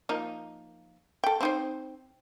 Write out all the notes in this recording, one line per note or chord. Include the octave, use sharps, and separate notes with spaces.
F3 A#3 D#4
A4 G5
C4 D#4 C5